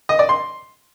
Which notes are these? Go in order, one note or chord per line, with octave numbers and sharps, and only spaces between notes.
D#5
D5
C6